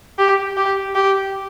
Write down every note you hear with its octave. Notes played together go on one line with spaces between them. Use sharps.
G4
G4
G4